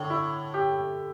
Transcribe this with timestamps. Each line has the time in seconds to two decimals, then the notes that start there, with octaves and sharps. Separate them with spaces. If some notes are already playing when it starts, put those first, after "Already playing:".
Already playing: A2 D3
0.10 E4
0.54 G4